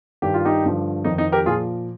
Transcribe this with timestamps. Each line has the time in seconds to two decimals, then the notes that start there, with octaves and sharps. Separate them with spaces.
0.22 G2 D#3 G4
0.34 F4
0.45 D#4 G4
0.63 G2 D3 F3
1.04 F2 D#3 D#4
1.18 D#4
1.32 G4 A#4
1.46 A#2 F4 G#4
1.50 F3